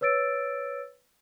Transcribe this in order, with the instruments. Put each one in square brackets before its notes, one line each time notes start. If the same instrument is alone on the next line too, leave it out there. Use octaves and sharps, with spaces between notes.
[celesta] B4 C#5 E6 A6 D7